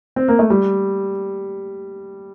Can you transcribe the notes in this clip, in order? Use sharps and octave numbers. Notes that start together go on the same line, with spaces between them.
C4
A#3
A3
G3